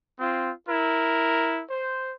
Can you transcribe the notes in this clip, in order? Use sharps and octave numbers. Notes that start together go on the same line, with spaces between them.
C4 F4
E4 A#4
C5